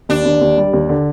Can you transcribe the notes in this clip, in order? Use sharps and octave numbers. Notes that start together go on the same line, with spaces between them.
D#2 D4
D#2
D#2
G3
D#2
D3